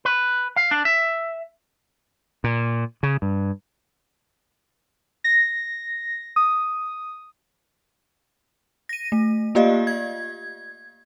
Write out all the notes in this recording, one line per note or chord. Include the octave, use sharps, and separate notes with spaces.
B4
F5
D4
E5
A#2
C#3
G2
A#6
D#6
A#6 D#7
A3
A#3 F4 G4 D5 D#5 F5
G#6